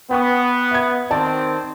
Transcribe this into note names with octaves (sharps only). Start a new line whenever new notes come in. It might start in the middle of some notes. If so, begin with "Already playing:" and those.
B3 G5 C#6 D#6
E5 G#6
D#3 C4 D5 A5